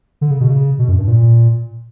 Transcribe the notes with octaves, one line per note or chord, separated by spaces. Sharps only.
D3
C#3
B2
C#3
B2
F#2
G2
A#2